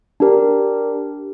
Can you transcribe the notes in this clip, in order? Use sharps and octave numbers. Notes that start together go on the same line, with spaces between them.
D4 G4 A#4